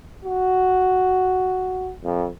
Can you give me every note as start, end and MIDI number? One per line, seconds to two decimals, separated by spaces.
0.25 1.91 66
2.04 2.27 41